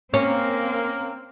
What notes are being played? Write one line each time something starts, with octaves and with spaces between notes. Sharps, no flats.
A#3 C4 C#4